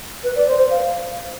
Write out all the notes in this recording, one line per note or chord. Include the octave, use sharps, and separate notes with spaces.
B4
D5
C5
C5
F5